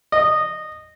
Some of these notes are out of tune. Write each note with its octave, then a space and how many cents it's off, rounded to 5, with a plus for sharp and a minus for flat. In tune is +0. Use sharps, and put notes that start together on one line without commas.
D#5 -15